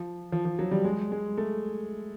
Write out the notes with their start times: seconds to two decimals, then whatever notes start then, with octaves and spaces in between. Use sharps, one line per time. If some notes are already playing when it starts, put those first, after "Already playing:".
Already playing: F3
0.32 F3
0.45 F3
0.59 F#3
0.71 G3
0.84 G#3
1.12 G#3
1.38 A3